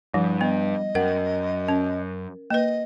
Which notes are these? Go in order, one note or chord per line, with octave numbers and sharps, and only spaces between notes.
G2 F3 G3
B3 D#5
F#2 A#4 F#5
C#4
A#3 B4 D#5